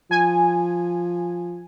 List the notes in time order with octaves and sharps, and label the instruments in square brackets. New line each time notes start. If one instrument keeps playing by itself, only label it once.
[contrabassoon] F3 [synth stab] G#5